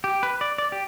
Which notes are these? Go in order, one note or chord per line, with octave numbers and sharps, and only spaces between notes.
G4
B4
D5
D5
G4